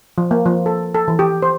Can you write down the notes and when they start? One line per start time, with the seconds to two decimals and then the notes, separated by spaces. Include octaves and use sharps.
0.18 F3
0.31 A#3
0.46 F3
0.66 A4
0.95 A4
1.08 E3
1.19 G4
1.43 C5